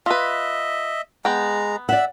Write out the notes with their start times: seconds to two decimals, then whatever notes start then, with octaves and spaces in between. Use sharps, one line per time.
0.06 F4 B4 D#5 E5
1.25 G#3 B3 G5 A#5
1.89 D5 E5 F#5 E6